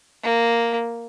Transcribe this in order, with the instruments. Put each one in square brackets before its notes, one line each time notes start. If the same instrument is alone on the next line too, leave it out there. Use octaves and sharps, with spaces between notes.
[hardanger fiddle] A#3